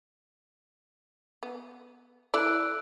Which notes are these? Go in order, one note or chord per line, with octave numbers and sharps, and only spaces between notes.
B3
E4 A4 D5 E6 F#6 D7